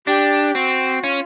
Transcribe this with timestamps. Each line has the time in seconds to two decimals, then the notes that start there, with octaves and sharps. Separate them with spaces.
0.07 D4 G4
0.55 C4 F#4
1.03 C#4 F4